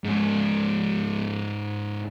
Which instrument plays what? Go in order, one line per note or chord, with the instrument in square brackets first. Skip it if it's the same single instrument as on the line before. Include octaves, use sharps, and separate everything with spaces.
[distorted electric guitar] G#2 C#4